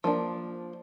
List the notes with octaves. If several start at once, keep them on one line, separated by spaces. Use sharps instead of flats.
F3 A#3 D4